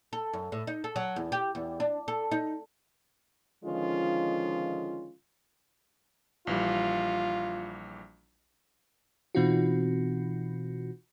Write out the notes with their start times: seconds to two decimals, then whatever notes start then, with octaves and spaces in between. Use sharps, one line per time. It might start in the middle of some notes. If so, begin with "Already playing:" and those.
0.13 A4
0.33 F#2
0.52 A2
0.67 D#4
0.84 A4
0.96 F#3
1.16 E2
1.32 G4
1.55 E2
1.80 D4
2.08 A4
2.32 D#4
3.64 D3 D#3 F3 G#3 C#4 F4
6.47 A#1 E3 G3 F4
9.35 B2 E3 C4 D#4 F4 F#4